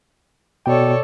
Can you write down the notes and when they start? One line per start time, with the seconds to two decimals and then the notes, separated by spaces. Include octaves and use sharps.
0.66 B2 A4 C#5 D5 G5